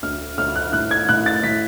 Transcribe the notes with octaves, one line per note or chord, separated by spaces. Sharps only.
D2 F6
D2 F6
F#6
A2 F#6
G#6
A2 F#6
A6
A2 B6